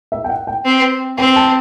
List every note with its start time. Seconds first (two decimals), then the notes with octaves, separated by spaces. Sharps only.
0.12 E5
0.24 G5
0.29 F#5
0.47 G5
0.65 C4
1.18 C4 G5
1.36 A5